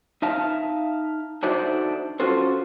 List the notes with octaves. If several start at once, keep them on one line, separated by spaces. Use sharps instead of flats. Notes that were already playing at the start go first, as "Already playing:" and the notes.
D#4 E5 F5 A5
D4 D#4 F#4 A4 C5 E5
C#4 F4 F#4 A4 C5